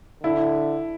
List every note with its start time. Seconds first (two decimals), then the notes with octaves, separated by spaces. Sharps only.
0.23 D3 E4